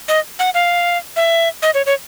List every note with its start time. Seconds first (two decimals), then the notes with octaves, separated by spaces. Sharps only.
0.08 D#5
0.39 F#5
0.54 F5
1.16 E5
1.62 D#5
1.74 C#5
1.86 C#5